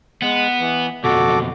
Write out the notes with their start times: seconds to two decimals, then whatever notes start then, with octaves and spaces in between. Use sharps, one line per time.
0.22 G#3 B3
0.60 E3
1.04 B1 F2 F#4 A4 D6